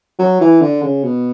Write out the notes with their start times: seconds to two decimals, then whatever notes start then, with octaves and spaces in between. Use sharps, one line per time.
0.19 F#3
0.41 E3
0.62 D3
0.83 C#3
1.03 B2